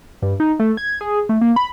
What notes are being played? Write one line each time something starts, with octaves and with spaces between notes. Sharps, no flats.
G2
D#4
A3
G#6
G#4
A3
A#3
B5